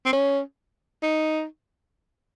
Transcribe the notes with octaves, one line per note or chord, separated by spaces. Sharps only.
C4
C#4
D#4